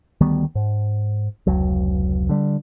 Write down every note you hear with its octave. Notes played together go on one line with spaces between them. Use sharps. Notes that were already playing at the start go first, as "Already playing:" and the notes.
D2 D#3 G3 B3
G#2
F1 C#2 F#3
D3 G3